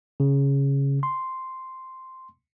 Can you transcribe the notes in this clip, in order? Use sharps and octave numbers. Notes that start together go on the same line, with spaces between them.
C#3
C6